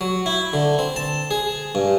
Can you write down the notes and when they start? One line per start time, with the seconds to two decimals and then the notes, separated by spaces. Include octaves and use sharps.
0.01 F#3
0.26 E4
0.53 D3
0.79 C4
0.96 A5
1.31 G#4
1.75 G2